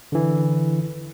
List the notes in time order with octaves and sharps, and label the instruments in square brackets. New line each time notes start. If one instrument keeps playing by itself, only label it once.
[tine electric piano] D3 E3